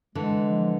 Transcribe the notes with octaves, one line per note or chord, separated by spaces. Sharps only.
D3 E3 G#3
F3